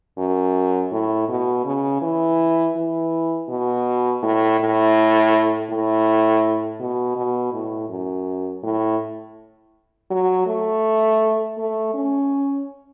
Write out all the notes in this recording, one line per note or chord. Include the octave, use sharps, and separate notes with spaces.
F#2
A2
B2
C#3
E3
E3
B2
A2
A2
A2
B2
B2
A2
F#2
A2
F#3
A3
A3
C#4